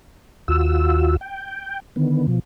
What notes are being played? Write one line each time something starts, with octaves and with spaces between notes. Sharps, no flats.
D#2 F4 F#4 E6
G5
D3 D#3 B3
B2 F3